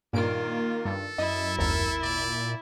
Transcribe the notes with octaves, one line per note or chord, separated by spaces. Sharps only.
G2 A#2 D#3 A#3 F4 D7
G2 A4
F#2 E4 D#5 E5
G#1 D#2 A4 A#4
A#2 D5